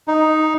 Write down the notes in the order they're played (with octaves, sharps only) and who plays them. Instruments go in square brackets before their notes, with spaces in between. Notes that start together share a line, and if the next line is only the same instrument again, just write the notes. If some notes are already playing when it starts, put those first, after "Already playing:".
[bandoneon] D#4